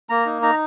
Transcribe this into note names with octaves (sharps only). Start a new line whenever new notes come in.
A#3 A#5
D#4
D#4 A#5